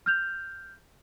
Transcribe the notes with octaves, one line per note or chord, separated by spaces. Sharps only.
F6 G6 F7